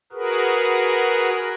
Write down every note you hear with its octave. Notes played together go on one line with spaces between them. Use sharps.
F#4 G#4 A#4 B4